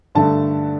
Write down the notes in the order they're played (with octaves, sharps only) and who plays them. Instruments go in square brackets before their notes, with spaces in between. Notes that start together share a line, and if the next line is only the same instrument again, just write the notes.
[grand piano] G2 D3 A3 A5